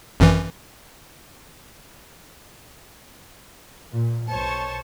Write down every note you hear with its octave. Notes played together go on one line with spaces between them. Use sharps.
G#1 F#2 E3
A#2
B1 C5 C#5 A5 C#6